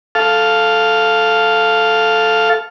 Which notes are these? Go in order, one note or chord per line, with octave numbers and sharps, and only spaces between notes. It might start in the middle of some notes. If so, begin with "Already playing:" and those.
A4 F5